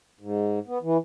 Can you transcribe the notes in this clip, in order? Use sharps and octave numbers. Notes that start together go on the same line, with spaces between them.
G#2
B3
E3